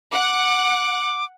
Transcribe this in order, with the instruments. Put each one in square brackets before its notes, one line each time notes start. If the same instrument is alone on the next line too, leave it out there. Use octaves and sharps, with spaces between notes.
[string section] F#5 [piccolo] D6